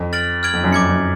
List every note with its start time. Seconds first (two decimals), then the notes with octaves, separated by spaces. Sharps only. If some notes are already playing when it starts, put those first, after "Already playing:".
Already playing: F2
0.13 F6 A6 D7 F#7
0.43 F6 G#6 D7 F#7
0.53 F2
0.64 F#2
0.73 F2 D6 G#6 C#7
0.88 F#2